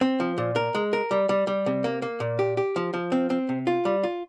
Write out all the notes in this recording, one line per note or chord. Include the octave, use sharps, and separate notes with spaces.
C4
F3
A#2
A#4
G#3
A#4
G3
G3
G3
C3
A#3
A#3
A#2
G4
G4
F3
F3
C4
C4
C3
F4
G3
F4